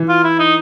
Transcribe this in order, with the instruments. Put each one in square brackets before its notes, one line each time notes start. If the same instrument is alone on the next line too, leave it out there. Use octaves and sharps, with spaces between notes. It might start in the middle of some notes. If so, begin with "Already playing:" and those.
Already playing: [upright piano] E3
[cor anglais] F4
E4
D#4